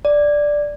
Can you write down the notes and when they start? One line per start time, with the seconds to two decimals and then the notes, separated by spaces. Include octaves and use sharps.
0.05 D5